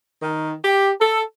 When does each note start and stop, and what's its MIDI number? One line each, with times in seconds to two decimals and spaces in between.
0.22 0.53 51
0.64 0.90 67
1.00 1.21 69